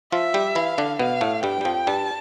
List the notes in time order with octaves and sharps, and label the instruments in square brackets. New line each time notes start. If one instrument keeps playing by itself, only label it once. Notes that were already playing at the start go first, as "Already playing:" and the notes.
[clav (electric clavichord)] F3 F4 [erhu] E5
[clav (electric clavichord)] G3 G4
[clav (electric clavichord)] E3 E4 [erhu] F5
[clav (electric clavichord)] D3 D4
[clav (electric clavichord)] B2 B3 [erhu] F5
[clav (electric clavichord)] A2 A3
[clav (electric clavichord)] G2 G3 [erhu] G5
[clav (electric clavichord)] G3
F2 F3
[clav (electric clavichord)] G2 G3 [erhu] A5